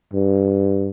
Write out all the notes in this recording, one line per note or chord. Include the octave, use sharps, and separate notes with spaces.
G2